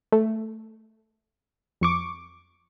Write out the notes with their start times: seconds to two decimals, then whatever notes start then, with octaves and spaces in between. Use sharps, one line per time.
0.12 A3
1.81 F2 C#6 D6